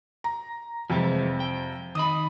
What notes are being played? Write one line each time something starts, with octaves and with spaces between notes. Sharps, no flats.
A#5
F2 C3 E3 G3 G#3
G5
D#3 D#5 B5 D#6